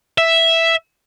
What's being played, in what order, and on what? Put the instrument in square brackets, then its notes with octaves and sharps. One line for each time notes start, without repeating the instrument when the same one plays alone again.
[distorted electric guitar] E5